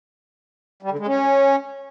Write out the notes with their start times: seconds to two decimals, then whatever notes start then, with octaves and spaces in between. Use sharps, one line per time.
0.83 G3
0.91 D3
0.99 G#3
1.07 C#4